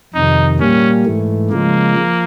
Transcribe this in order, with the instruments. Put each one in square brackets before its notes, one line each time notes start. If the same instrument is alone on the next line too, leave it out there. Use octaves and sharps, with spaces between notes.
[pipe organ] F2 C3 D#3 [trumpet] D#4
[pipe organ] A#2 G3 A#3 [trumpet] C#4
[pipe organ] G#2 E3 A3
[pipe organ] C#3 F3 G#3 [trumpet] A#3
[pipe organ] F3